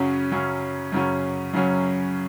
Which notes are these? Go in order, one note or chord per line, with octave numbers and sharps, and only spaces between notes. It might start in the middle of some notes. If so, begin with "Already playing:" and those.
Already playing: F#2 C#3 F#3 C#4
F#2 C#3 F#3 C#4
F#2 C#3 F#3 C#4
F#2 C#3 F#3 C#4